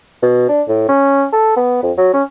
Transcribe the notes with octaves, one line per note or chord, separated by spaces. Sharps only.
B2
D4
A2
C#4
A4
B3
F2
F#3
C#4